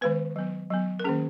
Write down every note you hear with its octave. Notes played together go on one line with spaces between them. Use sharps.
D#3 G#3 B3 B4
F#3 B3
F#3 B3
A#4
D#3 A#3 C#4 G#4